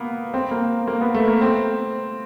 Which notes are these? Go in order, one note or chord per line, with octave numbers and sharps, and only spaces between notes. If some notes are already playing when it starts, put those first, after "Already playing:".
Already playing: A#3 B3
C4
A#3
A#3
B3
A3
A#3
C4